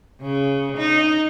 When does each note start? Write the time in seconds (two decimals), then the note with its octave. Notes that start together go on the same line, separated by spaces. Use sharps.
0.22 C#3
0.78 D#4